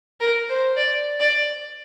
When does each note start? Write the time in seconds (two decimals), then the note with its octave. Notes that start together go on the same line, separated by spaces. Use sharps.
0.20 A#4
0.50 C5
0.77 D5
1.20 D5